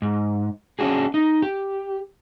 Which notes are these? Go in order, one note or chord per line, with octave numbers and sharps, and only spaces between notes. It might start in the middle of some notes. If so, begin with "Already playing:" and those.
G#2
C#4 D4 F#4 G#4
D#4
G4